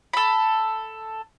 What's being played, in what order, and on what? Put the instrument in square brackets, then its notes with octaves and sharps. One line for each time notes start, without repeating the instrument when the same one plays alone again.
[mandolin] A4 B5